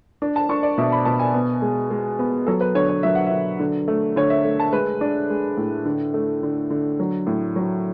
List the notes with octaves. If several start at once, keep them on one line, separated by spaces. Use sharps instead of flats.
D4
A5
D4 C#6
D5
B2 E5
B5
B2 A5
G#5
B3
G#3
G#3
B3
F#3 A4
B4
D3 C#5
C#5
F#3 E5
F#5
D3 E5
D3
A3
D3 C#5
E5
A3
A5
G#3 B4
D4
G#3
A2
D3
A3
D3
D3
F#3
A2
F#3